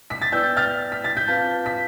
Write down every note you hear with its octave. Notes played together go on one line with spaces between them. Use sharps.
B6
A6
B3 E4 B4 D5 G5 E6 G6
F6 A6
B6
A6
G6 B6
C4 F4 B4 F5 A5
B6